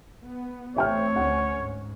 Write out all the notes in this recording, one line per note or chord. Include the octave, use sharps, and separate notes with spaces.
B3
A1 A3 C4 C#5 E5 G5 F6
D2 C#4 F#5
G#2